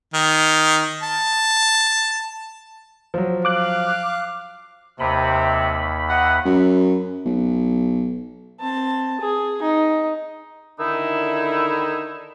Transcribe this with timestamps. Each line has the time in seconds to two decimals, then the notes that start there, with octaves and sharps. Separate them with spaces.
0.13 D#3
1.03 A5
3.14 F3 F#3
3.45 F5 D6 F#6
5.00 D#2 C3 B5
6.09 D#5 E5 F#5
6.45 F#2
7.26 B1
8.61 C4 A5
9.21 G#4
9.62 D#4
10.80 D3 D#3 D#4 E4